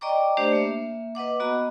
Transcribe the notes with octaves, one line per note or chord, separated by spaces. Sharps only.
D5 D#5 G5 A#5 C#6 D6
A3 D4 G4 C5 D5
A#3 E5
B4 D#5 F#5 D6
B3 F#4 D#5 A#5